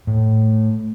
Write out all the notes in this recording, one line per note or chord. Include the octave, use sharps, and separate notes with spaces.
A2